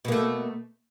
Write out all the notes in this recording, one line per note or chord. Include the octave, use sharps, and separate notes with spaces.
B2 A3 A#3